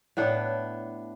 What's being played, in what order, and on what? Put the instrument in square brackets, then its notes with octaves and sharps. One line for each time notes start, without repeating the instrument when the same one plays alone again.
[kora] A2 B3 D4 A4